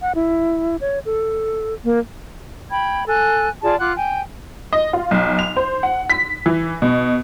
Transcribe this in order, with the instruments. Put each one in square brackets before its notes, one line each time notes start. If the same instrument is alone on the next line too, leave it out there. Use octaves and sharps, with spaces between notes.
[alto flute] F#5
E4
C#5
A4
A#3
[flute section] G5 B5 G#6
A4 G#5 F#6
F4 G#4 D5 A5
F4 F#5 D6 F#6
G5 G#5
[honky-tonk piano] D#5
F4
B1
F7
C5
F#5
B6
E3
B2